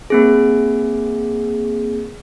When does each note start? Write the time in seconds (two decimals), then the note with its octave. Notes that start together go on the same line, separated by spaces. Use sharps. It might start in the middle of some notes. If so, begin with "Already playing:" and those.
0.10 A#3 C4 G#4